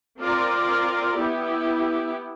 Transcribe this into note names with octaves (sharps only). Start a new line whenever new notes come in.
C4 F4 A#4 D5
B3 E4 G4